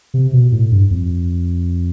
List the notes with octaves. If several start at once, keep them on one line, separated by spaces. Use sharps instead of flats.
C3
B2
A2
G2
F2